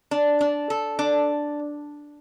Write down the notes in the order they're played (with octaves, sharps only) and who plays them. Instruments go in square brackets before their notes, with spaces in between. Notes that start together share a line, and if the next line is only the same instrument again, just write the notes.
[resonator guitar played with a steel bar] D4
D4
A4
D4